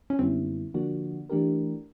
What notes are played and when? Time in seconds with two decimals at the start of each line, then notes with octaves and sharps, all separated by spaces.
0.10 C#4
0.19 F#2 D3 G3 B3 C4 E4
0.74 D3 F3 A#3 D4 F#4
1.29 E3 A3 D4 G4 A#4